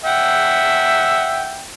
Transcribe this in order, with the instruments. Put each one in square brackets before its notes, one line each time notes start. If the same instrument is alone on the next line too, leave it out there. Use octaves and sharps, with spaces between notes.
[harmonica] E5 F#5 G5